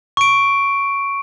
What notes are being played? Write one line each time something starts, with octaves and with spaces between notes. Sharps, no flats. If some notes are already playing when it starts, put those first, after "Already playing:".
C#6 D7